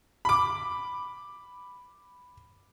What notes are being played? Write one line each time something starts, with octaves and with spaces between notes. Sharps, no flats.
B5 D6